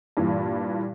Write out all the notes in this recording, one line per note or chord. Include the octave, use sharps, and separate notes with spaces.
G2 A#2 E3